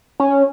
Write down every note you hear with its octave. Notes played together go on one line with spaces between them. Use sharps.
C#4